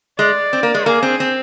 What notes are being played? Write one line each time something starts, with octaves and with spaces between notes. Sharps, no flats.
G#3 D5
C4
A#3
G#3
A#3 G#4
C4
C4